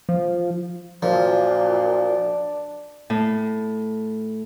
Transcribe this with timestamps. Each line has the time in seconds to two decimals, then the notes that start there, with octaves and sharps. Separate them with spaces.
0.09 F3
1.03 F#2 A#2 F3 D4
3.10 A2